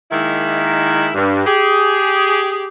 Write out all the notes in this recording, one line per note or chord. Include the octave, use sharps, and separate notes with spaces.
D#3 G#3 A#3 E4
G2
G4 G#4